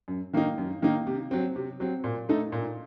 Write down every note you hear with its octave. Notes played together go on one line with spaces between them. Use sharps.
F#2
D#3 A#3 D#4
F#2
D#3 A#3 D#4
C3
F#3 C4
C3
F#3 C4
A#2
A3 D#4 A4
A#2